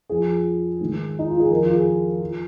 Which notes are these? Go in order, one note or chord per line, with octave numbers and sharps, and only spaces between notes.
F2 F3 G#4
G#2 D#3
D#4
F4
G#4
F2 D#3 A#4
F4
G#4
F3